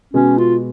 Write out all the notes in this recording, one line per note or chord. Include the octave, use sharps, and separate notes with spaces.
B2 G#3 B3 C#4 F#4
F4